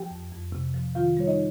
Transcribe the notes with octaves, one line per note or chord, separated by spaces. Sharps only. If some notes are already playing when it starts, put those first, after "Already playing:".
Already playing: F3 G4 G5
F2
F2
C3
F3
D#3 F4 F5
G3 C#5
D#4 D#5